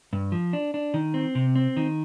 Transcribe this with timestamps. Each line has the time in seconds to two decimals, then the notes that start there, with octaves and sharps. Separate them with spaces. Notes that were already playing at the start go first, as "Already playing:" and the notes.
0.13 G2
0.32 F3
0.53 D4
0.74 D4
0.94 D#3
1.14 C4
1.35 C3
1.56 C4
1.77 D#3